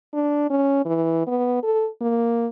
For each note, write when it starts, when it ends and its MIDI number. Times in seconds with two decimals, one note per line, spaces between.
0.14 0.49 62
0.50 0.82 61
0.85 1.23 52
1.27 1.59 59
1.63 1.87 69
2.02 2.47 58